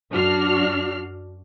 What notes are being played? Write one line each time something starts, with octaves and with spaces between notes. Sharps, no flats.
F#2 D4 F#4 F6 C7